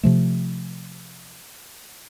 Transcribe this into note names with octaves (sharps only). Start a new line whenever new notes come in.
C3 F3 A3